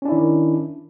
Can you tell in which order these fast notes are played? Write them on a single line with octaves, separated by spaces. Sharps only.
C#4 D4 E4 D#3